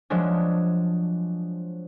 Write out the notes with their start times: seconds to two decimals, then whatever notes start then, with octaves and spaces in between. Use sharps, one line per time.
0.10 F3 F#3 G#3 D4